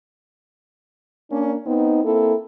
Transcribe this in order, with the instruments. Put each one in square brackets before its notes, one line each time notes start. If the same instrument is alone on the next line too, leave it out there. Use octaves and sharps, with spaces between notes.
[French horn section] A#3 C#4 D4
B3 C4 D#4
A#3 C4 E4 A4